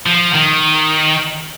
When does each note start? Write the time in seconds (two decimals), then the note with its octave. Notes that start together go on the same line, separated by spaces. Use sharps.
0.06 F3
0.35 D#3